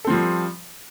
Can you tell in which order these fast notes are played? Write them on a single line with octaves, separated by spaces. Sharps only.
A4 C4 F3 G3